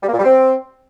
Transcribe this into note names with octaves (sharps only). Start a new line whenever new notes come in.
G3
A#3
A#2
G3
C4